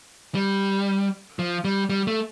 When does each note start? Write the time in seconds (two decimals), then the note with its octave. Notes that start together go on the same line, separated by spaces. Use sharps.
0.35 G3
1.39 F3
1.64 G3
1.89 G3
2.07 A3